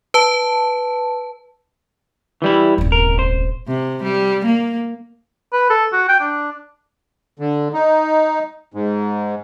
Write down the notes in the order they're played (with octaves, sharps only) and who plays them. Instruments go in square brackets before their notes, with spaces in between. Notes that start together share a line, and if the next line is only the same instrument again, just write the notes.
[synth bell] B4 A5
[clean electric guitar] E3 G3 E4
[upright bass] D#1 G#1
[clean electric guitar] A#4
C5
[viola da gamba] C3
G3
A#3
[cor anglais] B4
A4
F#4
G5
D4
[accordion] D3
D#4
G#2